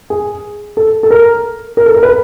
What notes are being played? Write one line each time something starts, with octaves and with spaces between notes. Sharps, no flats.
G#4
A4
A4
A#4
A#4
A4
A#4
B4